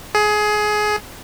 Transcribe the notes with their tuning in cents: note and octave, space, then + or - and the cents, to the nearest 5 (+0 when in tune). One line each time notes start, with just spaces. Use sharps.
G#4 +20